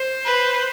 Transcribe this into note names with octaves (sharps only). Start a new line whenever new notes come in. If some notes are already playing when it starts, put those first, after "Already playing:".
Already playing: C5
B4